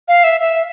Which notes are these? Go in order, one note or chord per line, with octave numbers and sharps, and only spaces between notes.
F5
E5
E5